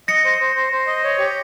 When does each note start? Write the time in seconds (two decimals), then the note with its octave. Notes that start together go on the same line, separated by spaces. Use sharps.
0.08 D#5 A#6 C#7
0.25 C5
0.41 C5
0.55 C5
0.72 C5
0.87 D#5
1.04 C#5
1.18 G4